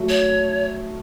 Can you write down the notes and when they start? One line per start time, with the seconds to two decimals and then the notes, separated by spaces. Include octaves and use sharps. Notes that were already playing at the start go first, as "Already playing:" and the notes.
Already playing: F#3 A3
0.09 C#5